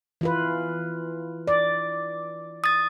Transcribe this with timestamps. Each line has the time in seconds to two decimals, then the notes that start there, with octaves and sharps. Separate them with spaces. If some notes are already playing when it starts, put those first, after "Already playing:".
0.21 E3 F4 B4
1.47 D5
2.64 D#6 A6